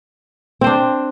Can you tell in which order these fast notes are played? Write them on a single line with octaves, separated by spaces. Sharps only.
C4 C5 D4